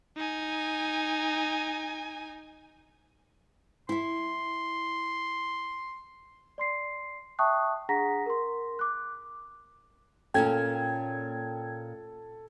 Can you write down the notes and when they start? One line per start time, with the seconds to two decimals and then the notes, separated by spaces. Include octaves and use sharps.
0.17 D#4 G#5
3.89 E4 E5 C6
6.58 D5 C6 C7
7.39 E5 G5 A5 C#6 D#6 F#6
7.89 D4 G#4 F#5 A#5 A#6 B6
8.26 A#4 C6
8.79 D6 F#6
10.34 A#2 A#3 C#4 A4 G5 G#6